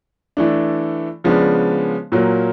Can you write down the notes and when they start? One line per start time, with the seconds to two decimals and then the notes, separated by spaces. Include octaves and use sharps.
0.37 E3 A3 D4
1.24 C#3 F3 G#3 B3 D4
2.12 A#2 F#3 A#3